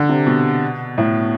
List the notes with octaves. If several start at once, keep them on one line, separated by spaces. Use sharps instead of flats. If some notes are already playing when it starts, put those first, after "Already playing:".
Already playing: D3
C3
B2
A2